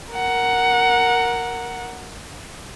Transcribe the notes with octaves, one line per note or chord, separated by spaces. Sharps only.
A#4 F#5